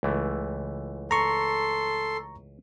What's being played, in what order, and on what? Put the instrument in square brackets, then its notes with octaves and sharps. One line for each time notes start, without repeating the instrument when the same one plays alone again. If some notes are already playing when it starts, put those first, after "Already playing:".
[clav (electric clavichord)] C#2 E3 A3
[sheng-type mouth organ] A4 C6 [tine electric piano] A#5 C#6